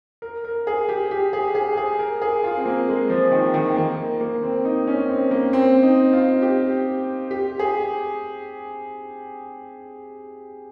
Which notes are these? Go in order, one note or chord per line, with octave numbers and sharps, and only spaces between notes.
A#4
A#4
G#4
G4
G4
G#4
G#4
G#4
A#4
G#4
F4
C4
A#3
G#3
F3
D#3
D#3
A#3
A#3
C4
D#4
C#4
C4
A#3
C4
D#4
F4
G4
G4
G#4